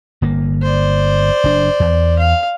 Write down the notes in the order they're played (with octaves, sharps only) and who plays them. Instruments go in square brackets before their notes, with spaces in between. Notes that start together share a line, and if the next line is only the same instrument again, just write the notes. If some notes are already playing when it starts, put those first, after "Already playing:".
[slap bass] G1 A#3
[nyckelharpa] C5 D5
[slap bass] F#1 D4
E2
[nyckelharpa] F5